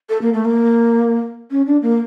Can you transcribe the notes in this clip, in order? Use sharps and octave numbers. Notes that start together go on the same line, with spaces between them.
A4
A#3
A3
A#3
C#4
D4
A#3